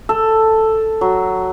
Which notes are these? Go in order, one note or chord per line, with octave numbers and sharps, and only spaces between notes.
A4
F#3